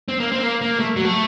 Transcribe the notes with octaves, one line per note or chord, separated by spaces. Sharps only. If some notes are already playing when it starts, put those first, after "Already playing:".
C4
A#3
C4
A#3
A#3
A3
F#3
A3